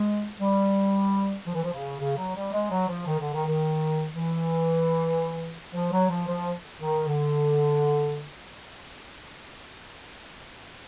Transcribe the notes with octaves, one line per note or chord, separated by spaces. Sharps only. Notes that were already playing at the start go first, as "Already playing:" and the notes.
Already playing: G#3
G3
F3
E3
F3
C#3
C#3
F#3
G3
G#3
F#3
F3
D#3
D3
D#3
D#3
E3
F3
F#3
F3
F3
D#3
D3